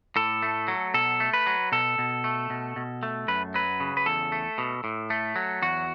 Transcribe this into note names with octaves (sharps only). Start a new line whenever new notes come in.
A2 A4
A3
F#3
B2 A4
A3
B4
F#3
B2 A4
B2
A3
B2
B2
A3
F#2 B4
F#3 B4
C#3
B4
E2 A4
A3
B2
A2
A3
F#3
E2 F#4